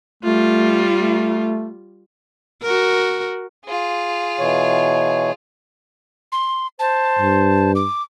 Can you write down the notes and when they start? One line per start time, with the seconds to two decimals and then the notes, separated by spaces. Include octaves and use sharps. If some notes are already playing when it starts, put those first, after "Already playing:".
0.23 G3 A3 F4
0.99 A3
2.62 F#4 A#4
3.65 F4 G#4
4.39 B2 E3 C#5
6.32 C6
6.79 C5 A5
7.19 G2
7.75 D6